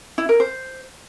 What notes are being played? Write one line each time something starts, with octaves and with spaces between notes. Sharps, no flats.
E4
A#4
C5